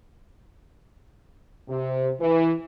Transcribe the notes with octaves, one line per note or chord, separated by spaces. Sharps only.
C3
E3